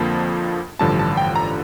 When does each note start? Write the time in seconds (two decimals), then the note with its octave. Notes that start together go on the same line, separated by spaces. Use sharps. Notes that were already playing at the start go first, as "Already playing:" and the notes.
Already playing: F2 D3 F3 A#3 A5
0.79 A1 G2 D3 F3 A5
0.99 A5
1.17 G5
1.36 A#5